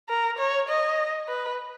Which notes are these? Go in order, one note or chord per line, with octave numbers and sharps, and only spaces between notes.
A#4
C#5
D#5
B4